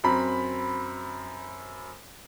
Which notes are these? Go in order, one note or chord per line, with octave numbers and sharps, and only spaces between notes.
F#2 C4 A#5 B5